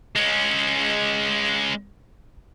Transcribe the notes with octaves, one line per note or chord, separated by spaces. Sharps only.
G#3 C#4